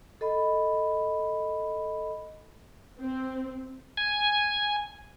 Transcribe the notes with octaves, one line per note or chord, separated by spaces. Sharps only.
A4 D#5 B5
C4
G#5